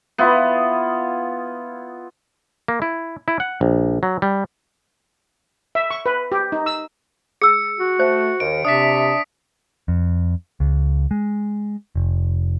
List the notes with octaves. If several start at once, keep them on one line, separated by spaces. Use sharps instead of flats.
B3 E4 F4
A#3
E4
E4
F#5
A#1
F#3
G3
E5
C#6
B4
G4
D#4
E6
G#4 E6 C#7
F#4
A3 C5
D#2 D#3 D7
C3 D4 E5 D#6 B6
F2
C#2
G#3
F1